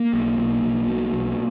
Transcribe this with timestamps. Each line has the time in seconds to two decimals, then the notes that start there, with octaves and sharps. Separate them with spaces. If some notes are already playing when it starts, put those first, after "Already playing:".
Already playing: A#3
0.14 B1
0.38 B1
0.63 B1
0.88 B2
1.13 B1